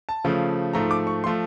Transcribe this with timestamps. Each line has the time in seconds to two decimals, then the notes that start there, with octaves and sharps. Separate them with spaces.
0.09 A5
0.24 C#3 F3 A3
0.73 G#2 F3 A3 A#5
0.91 D6
1.07 C#6
1.24 F3 A3 C6